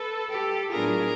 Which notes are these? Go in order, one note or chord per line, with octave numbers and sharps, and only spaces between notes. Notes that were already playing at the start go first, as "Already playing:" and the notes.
Already playing: A4 B4
G4 A4
A2 F#3 B3 D4 F4 G#4 A#4